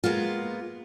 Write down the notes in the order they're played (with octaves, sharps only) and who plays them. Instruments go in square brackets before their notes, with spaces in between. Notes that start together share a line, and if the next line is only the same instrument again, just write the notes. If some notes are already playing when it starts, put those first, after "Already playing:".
[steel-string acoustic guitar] G#3 A#3 B3 F4